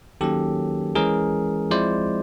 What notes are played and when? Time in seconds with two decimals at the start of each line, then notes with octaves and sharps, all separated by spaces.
0.21 D#3 F#3 A#3 C#4 G4 A4
0.95 E3 G#3 C#4 G#4 A#4
1.71 F3 G#3 C4 E4 C5 D5